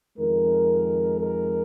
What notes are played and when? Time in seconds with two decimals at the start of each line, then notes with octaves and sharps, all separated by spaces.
0.18 F2 D#3 G#3 A#4
1.19 A#4